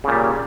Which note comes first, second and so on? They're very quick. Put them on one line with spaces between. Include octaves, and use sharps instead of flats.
C#3 A#2 G3